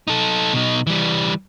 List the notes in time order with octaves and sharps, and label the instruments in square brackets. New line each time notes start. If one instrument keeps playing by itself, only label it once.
[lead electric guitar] D#4 A4
B2 D#4
E3 G3